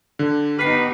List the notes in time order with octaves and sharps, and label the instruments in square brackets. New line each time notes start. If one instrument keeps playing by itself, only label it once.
[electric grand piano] D3
[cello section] B3 D#4 G4 [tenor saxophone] B4 [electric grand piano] F6 C7